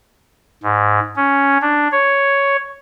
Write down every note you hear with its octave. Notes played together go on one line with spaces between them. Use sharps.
G#2
C#4
D4
C#5